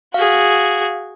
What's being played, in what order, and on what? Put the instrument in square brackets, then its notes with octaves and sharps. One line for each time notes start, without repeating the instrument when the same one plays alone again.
[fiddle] F#4 G#4 [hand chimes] F5